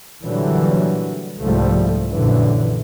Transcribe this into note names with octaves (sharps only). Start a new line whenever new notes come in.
A#2 D3 E3 F#3 G3
C2 G#2 F3 G3 A3
A#1 F#2 D3 E3